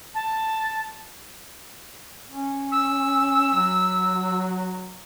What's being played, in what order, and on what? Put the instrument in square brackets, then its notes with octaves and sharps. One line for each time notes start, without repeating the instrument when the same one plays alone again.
[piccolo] A5
[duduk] C#4
[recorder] E6
[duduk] F#3